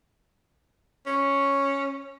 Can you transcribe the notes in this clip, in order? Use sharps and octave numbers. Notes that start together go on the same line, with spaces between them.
C#4